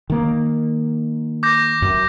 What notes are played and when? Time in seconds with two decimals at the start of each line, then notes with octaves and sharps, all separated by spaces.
0.10 D#3 A#3
1.43 D6 G6 A#6
1.82 F#2